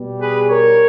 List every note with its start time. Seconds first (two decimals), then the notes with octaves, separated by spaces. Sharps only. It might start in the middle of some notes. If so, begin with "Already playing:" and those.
Already playing: B2 G3
0.19 G#4 B4
0.48 A#4 C#5